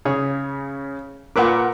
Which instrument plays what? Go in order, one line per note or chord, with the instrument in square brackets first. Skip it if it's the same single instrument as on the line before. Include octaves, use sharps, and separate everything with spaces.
[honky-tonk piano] C#3 [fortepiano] G#4 C#5
[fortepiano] A#2 B4 D6 [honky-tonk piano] A#4 F#5